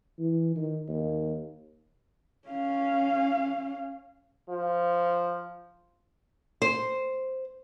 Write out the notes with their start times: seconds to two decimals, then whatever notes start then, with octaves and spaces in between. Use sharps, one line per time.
0.19 E3
0.56 D#3
0.89 D#2
2.48 C#4 F5
4.50 F3
6.62 C5